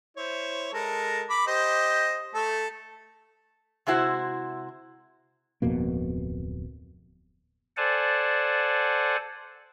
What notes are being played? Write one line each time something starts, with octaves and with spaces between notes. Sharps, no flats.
E4 C5 C#5
G#3 A4 A#4
B5 D6
G4 C5 D#5
A3 A4
C3 G#3 E4 F#4 C5
D1 F2 B2 A#3
A4 C5 D5 F#5 G#5 A5